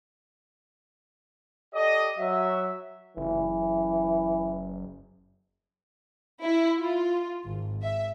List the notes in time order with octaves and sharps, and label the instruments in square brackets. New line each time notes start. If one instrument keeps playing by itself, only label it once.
[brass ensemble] G4 A4 D5 D#5
F#3 E5
[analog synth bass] F#1 [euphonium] E3
[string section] E4
F4
G#1
E5